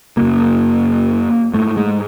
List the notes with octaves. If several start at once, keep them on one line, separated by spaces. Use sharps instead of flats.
F#2 C#3 A#3
G#2 A3
G#3